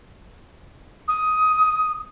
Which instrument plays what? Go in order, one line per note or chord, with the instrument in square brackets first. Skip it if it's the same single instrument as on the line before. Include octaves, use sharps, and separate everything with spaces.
[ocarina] D#6